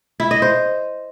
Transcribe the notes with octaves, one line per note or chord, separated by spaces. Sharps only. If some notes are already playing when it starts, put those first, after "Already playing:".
E4
D#5
C5